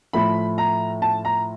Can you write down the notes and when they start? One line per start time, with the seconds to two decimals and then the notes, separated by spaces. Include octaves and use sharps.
0.13 A2 F3 A3 B5
0.58 A#5
1.02 A5
1.25 A#5